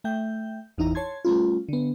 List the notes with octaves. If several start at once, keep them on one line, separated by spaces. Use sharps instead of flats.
A3 E5 G5 G6
G1 E2 E3 D#4 E4 A#5
C#5 A5 C6 G#6
G3 A3 C#4 F4
D3 B3